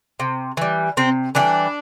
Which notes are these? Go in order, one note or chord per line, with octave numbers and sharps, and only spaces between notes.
C3
E3 G3
C3 C4
D3 E3 G3 D4